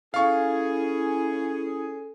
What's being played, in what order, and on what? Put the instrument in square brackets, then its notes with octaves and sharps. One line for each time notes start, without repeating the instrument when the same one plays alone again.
[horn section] C#4 G#4 [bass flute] E4 [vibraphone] A4 [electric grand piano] F5 C#6